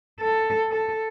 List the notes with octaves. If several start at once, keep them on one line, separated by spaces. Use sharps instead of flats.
A4
A4